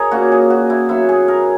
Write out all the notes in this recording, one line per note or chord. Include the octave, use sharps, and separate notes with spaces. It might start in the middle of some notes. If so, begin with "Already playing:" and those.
Already playing: G#4 A#4 C#5 D#5
A#2 A#3 C#4 F#4
G#4
F#4
E4
D#3 F#3 B3 E4
G#4
A#4